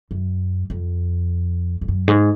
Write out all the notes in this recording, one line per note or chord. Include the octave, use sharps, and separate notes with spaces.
F#2
F2
F2
F#2
G#2